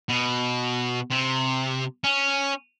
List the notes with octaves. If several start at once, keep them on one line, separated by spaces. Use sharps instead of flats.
B2
C3
C#4